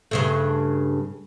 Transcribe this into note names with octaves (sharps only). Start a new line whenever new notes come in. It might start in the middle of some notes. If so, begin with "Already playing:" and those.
G2 C#3 A3